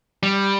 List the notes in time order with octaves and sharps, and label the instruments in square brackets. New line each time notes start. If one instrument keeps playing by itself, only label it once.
[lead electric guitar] G3